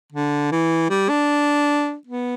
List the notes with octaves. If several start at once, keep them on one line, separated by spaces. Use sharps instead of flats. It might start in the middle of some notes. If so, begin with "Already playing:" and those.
D3
E3
G3
D4
B3